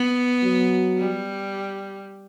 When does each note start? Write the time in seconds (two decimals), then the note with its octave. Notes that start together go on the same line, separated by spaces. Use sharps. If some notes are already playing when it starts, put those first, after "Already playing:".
Already playing: B3
0.44 F#3
0.98 G3